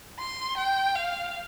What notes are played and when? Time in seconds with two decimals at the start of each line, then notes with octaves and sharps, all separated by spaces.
0.19 C6
0.57 G5
0.95 F5